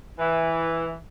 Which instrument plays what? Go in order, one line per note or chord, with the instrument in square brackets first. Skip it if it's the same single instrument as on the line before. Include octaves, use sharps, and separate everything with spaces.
[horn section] E3